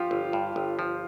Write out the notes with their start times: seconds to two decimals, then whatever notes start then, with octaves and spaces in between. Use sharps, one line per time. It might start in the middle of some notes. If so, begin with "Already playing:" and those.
Already playing: F3 F4 G4
0.11 G1
0.33 G2
0.56 G1
0.79 F3